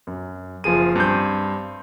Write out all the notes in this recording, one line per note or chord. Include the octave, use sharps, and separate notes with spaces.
F#2
F#1 F3 G#4 D#7
G2 C4 G6